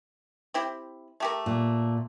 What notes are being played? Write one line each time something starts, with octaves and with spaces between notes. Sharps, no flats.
C4 E4 G4
A3 G4 A#4
A#2